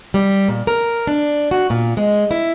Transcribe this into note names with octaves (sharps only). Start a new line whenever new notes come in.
G3
A#2
A#4
D4
F#4
A#2
G#3
E4